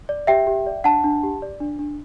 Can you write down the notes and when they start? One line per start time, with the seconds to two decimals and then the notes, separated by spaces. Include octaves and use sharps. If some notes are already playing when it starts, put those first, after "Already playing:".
0.09 D5
0.27 G4 E5 G5
0.47 G4
0.66 D5
0.84 D4 F#5 A5
1.04 D4
1.23 G4
1.42 D5
1.60 D4
1.79 D4